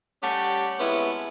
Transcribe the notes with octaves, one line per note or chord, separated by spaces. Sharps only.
G3 A3 C#4 G4 F#5
C3 G#3 B3 C#4 E4 B4